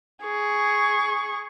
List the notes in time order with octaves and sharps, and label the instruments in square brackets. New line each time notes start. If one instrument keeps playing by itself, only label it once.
[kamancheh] G#4 C#6